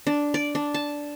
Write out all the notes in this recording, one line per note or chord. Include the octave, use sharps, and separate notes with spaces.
D4
D5
D4
A5